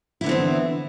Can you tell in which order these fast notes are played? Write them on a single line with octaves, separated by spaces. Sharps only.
E4 D3 B3 C4 E3